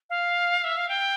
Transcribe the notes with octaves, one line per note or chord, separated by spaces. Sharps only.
F5
E5
F5
G5